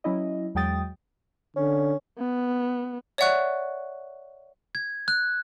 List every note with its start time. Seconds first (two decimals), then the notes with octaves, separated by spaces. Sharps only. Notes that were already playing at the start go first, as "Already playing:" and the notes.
0.04 F#3 C#4 E4 D#5
0.55 E2 F#3 G#3 G5 D#6 A6
1.56 D3 C#4
2.18 B3
3.18 C#5 D5 E5 F#5 C#6 F#6
4.75 G#6
5.08 F#6